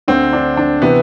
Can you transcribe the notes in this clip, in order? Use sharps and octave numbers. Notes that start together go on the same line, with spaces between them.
D2 D3 C4
D4
D4
C3 E3 B3